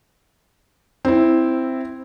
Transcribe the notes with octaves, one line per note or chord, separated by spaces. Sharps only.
C4 E4